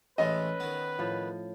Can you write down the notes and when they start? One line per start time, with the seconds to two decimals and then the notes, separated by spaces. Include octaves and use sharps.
0.18 A1 A2 G#3 C#4 A4 B4 D#5
0.60 D#3 B3
0.99 A2 F3